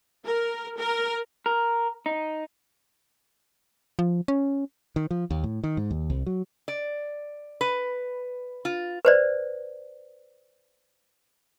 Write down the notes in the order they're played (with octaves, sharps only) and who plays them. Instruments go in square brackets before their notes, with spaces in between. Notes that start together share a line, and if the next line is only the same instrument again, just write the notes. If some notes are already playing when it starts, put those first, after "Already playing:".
[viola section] A#4
A#4
[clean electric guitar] A#4
D#4
[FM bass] F3
C#4
[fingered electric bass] D#3
F3
D#2
A2
D#3
G#2
D#2
C2
F#3
[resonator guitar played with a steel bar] D5
B4
F4
[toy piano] B4 C5 D5